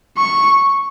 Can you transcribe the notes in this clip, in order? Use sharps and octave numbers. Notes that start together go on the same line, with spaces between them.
C#6